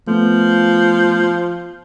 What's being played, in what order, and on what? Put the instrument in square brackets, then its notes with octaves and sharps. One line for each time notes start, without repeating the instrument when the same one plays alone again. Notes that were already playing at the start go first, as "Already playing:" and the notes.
[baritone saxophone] F3 [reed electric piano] A3 B3